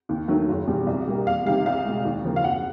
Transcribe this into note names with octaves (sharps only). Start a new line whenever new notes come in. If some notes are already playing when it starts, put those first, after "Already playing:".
D#2
D#3 F#3 A3
F#1
E2 B2 G3
C2
B2 G3 A#3
E2 F5
C3 D#3 G3 F5
C2 F5
B2 G#3
D#2
C#3 F3 A#3
F5
F#1 F#5